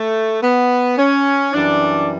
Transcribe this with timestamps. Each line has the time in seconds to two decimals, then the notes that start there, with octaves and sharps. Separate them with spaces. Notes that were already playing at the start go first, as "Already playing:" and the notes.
Already playing: A3
0.42 B3
0.97 C#4
1.53 F#2 E3 G3 D4